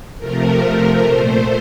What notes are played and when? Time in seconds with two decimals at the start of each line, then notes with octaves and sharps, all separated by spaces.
0.18 C3 F3 A3 A#4
1.03 A#2 A3 C5